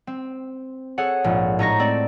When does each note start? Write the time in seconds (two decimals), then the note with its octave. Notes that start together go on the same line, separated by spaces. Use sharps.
0.07 C4
0.98 G#4 A4 C#5 F#5
1.24 A#1 G#2
1.59 A2 D#4 C#6 A#6
1.79 A3 C4 D5